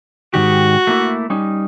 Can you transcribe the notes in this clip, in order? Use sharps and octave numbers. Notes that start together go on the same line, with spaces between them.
G#2 D#3 F#4 G4
A3 A#3 E4
G3 C#4 D#4